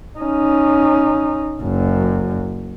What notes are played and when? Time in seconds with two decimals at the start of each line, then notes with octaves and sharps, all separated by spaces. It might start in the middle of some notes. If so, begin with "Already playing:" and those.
0.19 C#4 D#4
1.62 F#1 F#2